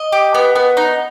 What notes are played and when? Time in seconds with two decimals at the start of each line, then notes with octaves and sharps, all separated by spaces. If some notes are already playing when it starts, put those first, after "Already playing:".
Already playing: D#5
0.12 G4
0.35 B3
0.55 B3
0.77 D#4